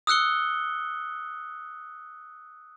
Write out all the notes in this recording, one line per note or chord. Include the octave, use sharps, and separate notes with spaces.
D#6 E6 F#6 C#7 G7